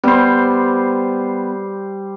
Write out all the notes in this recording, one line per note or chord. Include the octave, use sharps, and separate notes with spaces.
G3 B3 C5